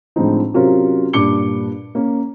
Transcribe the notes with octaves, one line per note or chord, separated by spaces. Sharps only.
A2 D3 F3 G#3 C4 D#4
C3 F#3 C#4 F4 A#4 C5
G2 A#2 D4 D6 C#7 G7
A#3 C#4